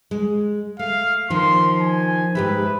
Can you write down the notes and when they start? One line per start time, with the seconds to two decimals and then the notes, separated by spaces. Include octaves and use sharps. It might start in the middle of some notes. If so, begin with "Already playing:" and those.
0.11 G#3
0.79 A3 F5
1.30 D#3 F3 C6
1.81 G#5
2.35 G#2 G4 B4 E5